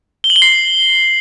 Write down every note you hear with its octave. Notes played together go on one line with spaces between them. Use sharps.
G7
F#7
G7
C7